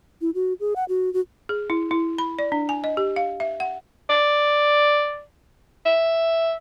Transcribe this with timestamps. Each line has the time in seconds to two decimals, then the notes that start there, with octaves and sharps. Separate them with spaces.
0.21 E4
0.35 F#4
0.60 G#4
0.76 F#5
0.89 F#4
1.14 F#4
1.49 G#4
1.70 E4
1.91 E4
2.19 B5
2.39 D5
2.52 D4
2.69 G#5
2.84 D#5
2.97 G4
3.16 F5
3.40 E5
3.60 F#5
4.10 D5
5.86 E5